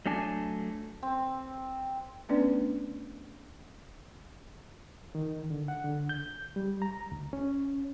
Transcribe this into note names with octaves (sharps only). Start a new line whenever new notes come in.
F#3 A3 D4 G#5 A5
C4
A3 B3 C#4 D4 B4 D5
D#3
D3
F#5
D3
G6
G3
A#5
D2
C#4